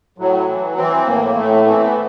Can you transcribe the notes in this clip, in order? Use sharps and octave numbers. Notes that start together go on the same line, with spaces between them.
A2 F#3
E3
E3 C4
A2 A#3
A2 A3
E3 C4
B3